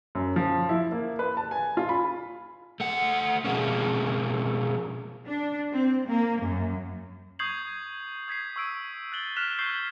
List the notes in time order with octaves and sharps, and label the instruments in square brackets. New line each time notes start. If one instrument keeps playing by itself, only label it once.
[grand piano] F#2
F3
E4
A#3
B4
A5
G#5
F4
B5
[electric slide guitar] A3 F#5
B2 F3 G#3 A#3 C#4
[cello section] D4
C4
A#3
F#2
[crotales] C#6 D#6 G6 G#6 C7 F#7
D#6 G#6 B6 C7
C#6 E6 D7
F#6 A6 F#7 G7
F6 F#6 B6 E7 F7
C#6 E6 G6 G#6 C7 E7